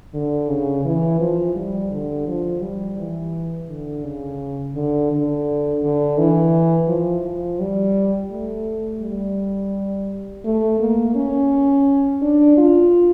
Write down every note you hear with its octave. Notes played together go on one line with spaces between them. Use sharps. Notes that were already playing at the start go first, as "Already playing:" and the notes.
D3
C#3
E3
F3
G3
D3
F3
G3
E3
D3
C#3
D3
D3
D3
E3
F3
F3
G3
A3
G3
A3
A#3
C#4
D4
F4